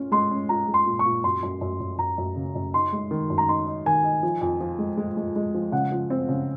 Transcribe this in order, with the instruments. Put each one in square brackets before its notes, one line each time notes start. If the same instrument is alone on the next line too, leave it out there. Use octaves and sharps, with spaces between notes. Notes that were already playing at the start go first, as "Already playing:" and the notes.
Already playing: [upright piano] C#4 F4
[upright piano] G#3 [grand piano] C6
[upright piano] C#4
[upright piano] F4 [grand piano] A#5
[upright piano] G#3
[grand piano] C6
[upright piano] A#2
[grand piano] C#6
[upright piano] A#2
[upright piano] F#2 [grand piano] C6
[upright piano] F#2
F#2
F#2
[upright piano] F#2 [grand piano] A#5
[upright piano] F#2
C#3
F#2
[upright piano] D#4 [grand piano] C6
[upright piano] G#3
D#3
F#2
[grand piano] A#5
[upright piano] D#4 [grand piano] C6
[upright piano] D#4
[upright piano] D#3 [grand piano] G#5
[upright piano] D#4
F3
F2
F3
G#3
G#3
G#3
G#3
F3
[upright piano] C#3 [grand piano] F#5
[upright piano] F3
C4
C#3